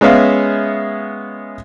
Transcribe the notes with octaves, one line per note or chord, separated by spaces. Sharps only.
G#3 B3 C#4 E5 F5